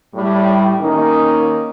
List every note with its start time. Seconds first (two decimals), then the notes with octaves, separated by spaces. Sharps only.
0.14 A2 G3
0.80 D#3 A#3 C#4 D#4